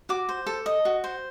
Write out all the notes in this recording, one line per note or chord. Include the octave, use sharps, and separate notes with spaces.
F#4 D6
C5
A4
D#5
F#4
C5